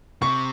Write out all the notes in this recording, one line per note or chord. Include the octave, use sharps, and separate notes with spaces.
C3 C#6